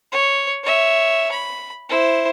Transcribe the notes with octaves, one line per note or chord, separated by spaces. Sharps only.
C#5
C#5 E5
B5
E4 C5